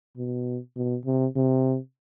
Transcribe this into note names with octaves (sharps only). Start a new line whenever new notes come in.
B2
B2
C3
C3